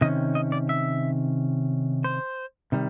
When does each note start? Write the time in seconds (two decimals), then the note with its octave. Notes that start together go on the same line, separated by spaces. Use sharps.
0.01 C3 D#3 C#4 D#5
0.35 D#5
0.52 D5
0.69 E5
2.04 C5
2.72 C3 D#3 G3